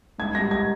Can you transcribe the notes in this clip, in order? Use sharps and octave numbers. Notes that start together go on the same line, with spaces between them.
G#2 G#6
G3 A#6
G#6